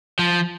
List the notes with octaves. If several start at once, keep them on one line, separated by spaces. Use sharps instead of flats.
F3